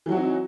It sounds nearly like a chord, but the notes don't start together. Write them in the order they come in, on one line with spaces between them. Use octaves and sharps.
E3 F#3 F#4 C4 D#4